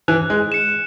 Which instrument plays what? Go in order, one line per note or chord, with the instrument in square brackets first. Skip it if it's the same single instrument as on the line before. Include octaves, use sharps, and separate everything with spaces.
[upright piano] E3 [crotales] F#6
[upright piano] G#3
[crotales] C#7 E7